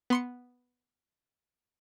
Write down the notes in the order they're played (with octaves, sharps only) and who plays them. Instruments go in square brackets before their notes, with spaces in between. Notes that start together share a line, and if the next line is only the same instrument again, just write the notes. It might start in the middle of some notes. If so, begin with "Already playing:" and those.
[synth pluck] B3 C6 C#7